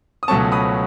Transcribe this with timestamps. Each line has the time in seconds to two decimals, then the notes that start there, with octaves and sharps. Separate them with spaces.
0.23 D#6
0.28 C#2 B2 F#3 A3 C#4 A5 C#6
0.52 B5 D#6